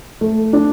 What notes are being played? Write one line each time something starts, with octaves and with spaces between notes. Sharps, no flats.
A3
D4